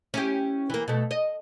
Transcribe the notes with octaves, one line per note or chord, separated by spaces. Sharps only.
C#4 E4 G4
E3 A#3
B2 A3
D#5